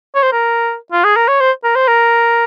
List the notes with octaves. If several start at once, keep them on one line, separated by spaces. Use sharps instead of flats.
C#5
C5
A#4
F4
G#4
A#4
C#5
C5
A#4
C5
A#4